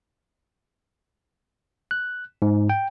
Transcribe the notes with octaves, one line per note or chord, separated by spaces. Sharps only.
F#6
G#2
G5